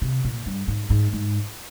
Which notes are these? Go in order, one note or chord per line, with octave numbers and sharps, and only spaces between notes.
C3
A#2
G2
G#2
G#2
G#2